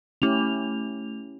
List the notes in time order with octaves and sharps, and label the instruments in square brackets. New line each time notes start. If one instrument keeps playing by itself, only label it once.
[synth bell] A3 F7 [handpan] C#4 E4 G4